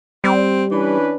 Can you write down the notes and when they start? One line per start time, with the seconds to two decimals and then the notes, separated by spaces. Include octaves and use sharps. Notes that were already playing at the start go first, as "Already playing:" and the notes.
0.24 G3 C4
0.71 E3 C#4 D4 B4